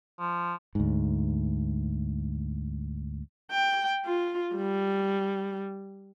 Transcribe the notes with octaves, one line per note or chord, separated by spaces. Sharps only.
F3
D2 G#2
G5
F4
G3